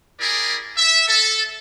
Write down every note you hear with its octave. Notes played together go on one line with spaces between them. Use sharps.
E4 G4 G#4 A#4 D5
E5
A4